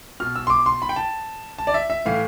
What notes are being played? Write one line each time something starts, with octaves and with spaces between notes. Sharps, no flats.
B2 F6
E6
C6
D6
C6
B5
G5
A5
A5
D5
E5
E5
A2 E3 F5